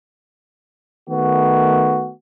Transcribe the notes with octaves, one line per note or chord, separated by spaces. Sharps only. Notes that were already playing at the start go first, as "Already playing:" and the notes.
D#3 A3 B3 F#4